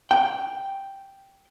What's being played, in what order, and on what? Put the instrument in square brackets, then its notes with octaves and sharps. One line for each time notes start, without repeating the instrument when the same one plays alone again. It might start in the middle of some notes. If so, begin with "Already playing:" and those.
[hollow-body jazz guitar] G5